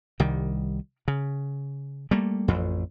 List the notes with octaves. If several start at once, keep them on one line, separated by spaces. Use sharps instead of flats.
C2 D#3 G3
C#3
G3 A3 A#3
A1 F2